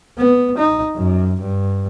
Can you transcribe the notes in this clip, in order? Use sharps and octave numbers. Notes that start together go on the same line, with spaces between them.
B3
D#4
F#2
G2